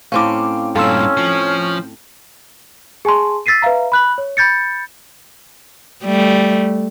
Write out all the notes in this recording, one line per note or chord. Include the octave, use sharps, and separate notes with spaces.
A2 C4 C#4 F5 D6
G2 A#2 C#4 A4 F5 C6 E6
F3 C#6
G#4 G#5 A5 C6
E6 A6 B6 C7 D#7
B4 E5 F5 A#5
B5 F#6 F#7
C#5
B5 G6 A6 C#7
G3 A3